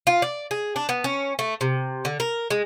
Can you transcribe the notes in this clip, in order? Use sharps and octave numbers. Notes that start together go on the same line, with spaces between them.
F4
D5
G#4
D4
B3
C#4
A3
C3
D3
A#4
G#3